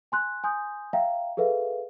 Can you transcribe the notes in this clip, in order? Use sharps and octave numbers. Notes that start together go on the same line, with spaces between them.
G#5 C6 F#6
G#5 C6 D#6 G6
E5 F5 G5 A#5
G#4 A4 B4 E5 F5